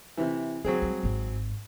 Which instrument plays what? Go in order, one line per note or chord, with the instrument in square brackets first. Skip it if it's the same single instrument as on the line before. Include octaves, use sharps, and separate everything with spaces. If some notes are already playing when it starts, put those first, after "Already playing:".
[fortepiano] C3 E3
[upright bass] D2 [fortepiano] F#3 C4 G#4
[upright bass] G3 G#3
G#1 G#2